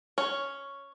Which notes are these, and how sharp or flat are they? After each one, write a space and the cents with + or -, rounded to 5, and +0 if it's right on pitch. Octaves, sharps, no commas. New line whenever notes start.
C#4 +5 C#5 +0